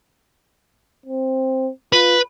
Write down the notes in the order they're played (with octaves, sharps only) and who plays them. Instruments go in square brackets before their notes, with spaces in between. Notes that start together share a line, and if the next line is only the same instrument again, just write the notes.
[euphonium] C4
[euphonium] F4 [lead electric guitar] B4